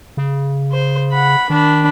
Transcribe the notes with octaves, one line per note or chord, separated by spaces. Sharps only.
C#3
C5
F#5 B5
D#3 D4 B5